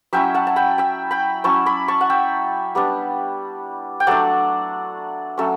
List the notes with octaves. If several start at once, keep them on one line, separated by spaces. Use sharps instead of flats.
F#3 C#4 E4 E5 G5
F#5 A5
A5
G5 B5
E5 G5
G5 B5
F#3 C#4 E4 A5 C#6
B5 D6
A5 C#6
F#5
E5 G5
G3 B3 D4
G5
F#3 A3 D4 D5 F#5
F#3 A3 C#4